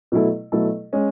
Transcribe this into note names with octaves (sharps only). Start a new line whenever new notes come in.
B2 F#3 A3 E4 A4
B2 F#3 A3 E4 A4
G#3 C#4